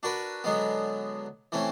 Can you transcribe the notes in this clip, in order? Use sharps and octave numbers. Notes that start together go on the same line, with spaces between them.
D4 F#4 A#4 B4
D3 F#3 G#3 B3
E3 A3 C4 C#4